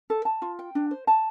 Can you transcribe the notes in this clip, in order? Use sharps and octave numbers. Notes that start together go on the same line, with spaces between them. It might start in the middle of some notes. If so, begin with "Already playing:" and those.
A4
A5
F4
G5
D4
C5
A5